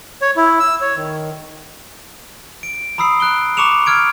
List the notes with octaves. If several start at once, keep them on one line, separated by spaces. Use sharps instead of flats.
C#5
E4
E6
C#5
D#3
D7
A#5 B5 D#6 E6 C7
A#5 F#6 D7 G7
A#5 C#6 D6 C#7 E7 F7
E6 F6 G#6 D7